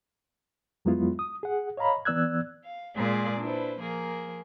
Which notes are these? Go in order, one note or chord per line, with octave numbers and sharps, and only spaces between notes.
F2 F#3 G#3 B3 E4 F4
D#6
G#4 F#5
C#5 D#5 F5 A#5 B5
E3 B3 D5 E6 F#6 G#6
F5
A#2 G#3 G#4 D5
D4 E4 B4 C5
F3 A#3 G#4 A#4